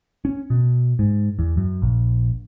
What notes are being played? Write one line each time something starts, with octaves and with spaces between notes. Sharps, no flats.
C#4
B2
G#2
E2
F#2
A#1